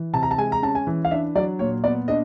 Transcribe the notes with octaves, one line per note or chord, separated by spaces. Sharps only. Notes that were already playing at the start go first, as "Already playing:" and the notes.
Already playing: E3
C3 A5
A#5
A5
G#3 G#5
A#5
C#4 A5
G#5
E3
F5
D4 E5
F#3 D5
A#2 C#5
B3 D5
D4 D#5